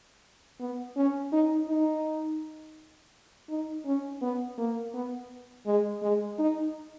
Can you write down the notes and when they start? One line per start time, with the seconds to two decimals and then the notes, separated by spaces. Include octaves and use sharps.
0.60 B3
0.96 C#4
1.32 D#4
1.68 D#4
3.49 D#4
3.85 C#4
4.21 B3
4.58 A#3
4.94 B3
5.66 G#3
6.02 G#3
6.39 D#4